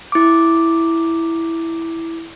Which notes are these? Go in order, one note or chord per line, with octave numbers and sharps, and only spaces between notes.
E4 D6